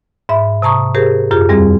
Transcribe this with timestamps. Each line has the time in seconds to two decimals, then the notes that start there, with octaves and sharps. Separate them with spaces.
0.29 G#2 E5 B5
0.62 C3 A5 A#5 C#6 D#6
0.95 G4 G#4 A#4 C5
1.31 F#2 F4 G4 G#4
1.49 E2 G3 C4 G#4